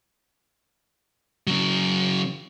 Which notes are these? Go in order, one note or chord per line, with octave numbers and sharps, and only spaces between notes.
C#3 F#3